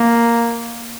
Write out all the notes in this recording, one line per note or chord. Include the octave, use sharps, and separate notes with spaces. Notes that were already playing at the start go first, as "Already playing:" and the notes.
Already playing: A#3